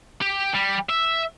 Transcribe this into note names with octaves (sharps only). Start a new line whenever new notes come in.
G4
G3
E5